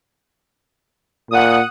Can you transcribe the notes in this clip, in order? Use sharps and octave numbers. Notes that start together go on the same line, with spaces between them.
A#2 F#5 D#6